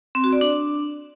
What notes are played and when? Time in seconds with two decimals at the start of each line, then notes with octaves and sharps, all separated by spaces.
0.15 C4
0.24 F#4
0.33 D5
0.41 D4